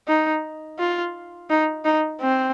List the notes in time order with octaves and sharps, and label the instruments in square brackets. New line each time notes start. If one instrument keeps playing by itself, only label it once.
[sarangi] D#4
F4
D#4
D#4
C4